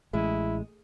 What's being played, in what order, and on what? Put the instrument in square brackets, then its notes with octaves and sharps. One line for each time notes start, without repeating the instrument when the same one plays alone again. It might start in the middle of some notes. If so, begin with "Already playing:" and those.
[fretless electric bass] A1 [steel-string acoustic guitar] G#3 [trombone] E4